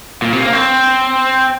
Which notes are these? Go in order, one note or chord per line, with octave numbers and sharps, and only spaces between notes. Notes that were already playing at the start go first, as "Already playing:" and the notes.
A#2
C3
A#3
C4